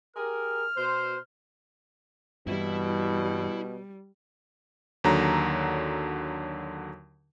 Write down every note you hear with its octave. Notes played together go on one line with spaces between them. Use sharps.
G4 G#4 A#4 F6
B2 C5
G2 B2 E3 G3 E4
D#2 D3 F#3 A#5